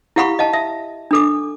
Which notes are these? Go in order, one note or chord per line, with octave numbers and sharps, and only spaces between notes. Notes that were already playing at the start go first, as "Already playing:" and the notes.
E4 G4 F5 F#5 B5 C#6
D#5 F5 A5
E5
D4 A4 D6